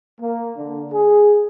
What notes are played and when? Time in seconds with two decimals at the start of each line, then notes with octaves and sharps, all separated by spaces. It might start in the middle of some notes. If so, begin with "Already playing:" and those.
0.20 A#3
0.56 D3
0.92 G#4